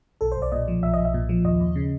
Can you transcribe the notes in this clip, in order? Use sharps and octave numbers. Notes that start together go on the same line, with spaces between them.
B1 A4
C5
B1
D5
A#2 D#5
F3
B1 E5
B1 D#5
E5
A#2
F3
D#2 D#5
D#2
C#3